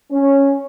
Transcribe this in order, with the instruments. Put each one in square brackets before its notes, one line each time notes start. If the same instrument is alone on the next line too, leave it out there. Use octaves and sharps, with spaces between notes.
[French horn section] C#4